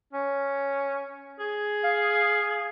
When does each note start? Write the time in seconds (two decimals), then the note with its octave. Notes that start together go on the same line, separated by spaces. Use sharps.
0.13 C#4
1.40 G#4
1.84 F5